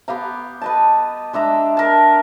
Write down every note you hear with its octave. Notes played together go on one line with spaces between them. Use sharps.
B3 G4 F5 A#5
B4 D#5 A5
G#3 D4 E5 A#5
A#4 A5